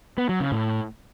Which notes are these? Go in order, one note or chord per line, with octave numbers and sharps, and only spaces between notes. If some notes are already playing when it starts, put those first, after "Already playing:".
B3
F#3
C#3
A2